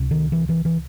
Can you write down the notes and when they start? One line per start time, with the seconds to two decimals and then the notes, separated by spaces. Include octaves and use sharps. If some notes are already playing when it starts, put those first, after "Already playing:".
Already playing: C#2 C3
0.11 D#3
0.32 E3
0.49 E3
0.65 E3